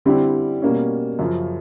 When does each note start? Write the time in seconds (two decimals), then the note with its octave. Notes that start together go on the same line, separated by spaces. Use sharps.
0.05 D3 G3 C4 E4 G4
0.62 B2 G3 A#3 C#4
1.19 F#2 C#3 F3